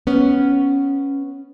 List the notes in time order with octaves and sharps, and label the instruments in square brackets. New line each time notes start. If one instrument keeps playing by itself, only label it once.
[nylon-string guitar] B3 C#4